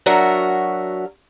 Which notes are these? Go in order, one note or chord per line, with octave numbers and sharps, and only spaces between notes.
F#3 D4 F#4 A#4 E5